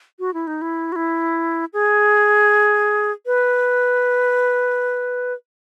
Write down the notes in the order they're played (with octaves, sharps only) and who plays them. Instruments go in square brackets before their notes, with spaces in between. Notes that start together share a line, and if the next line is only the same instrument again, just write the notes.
[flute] F#4
E4
D#4
E4
F#4
E4
G#4
B4